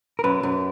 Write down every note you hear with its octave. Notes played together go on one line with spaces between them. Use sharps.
A#4
F#2 B4
F#2